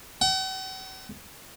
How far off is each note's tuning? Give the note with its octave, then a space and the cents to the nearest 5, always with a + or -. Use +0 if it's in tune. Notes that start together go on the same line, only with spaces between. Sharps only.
F#5 +45